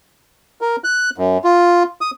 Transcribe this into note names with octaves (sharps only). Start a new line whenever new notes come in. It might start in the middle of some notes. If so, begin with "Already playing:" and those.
A#4
F#6
F#2
F4
D#6